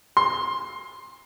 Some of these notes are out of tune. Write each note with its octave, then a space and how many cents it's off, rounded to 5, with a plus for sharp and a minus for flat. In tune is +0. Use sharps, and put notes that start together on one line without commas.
C6 +20